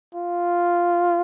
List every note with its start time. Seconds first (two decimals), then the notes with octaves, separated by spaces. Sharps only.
0.15 F4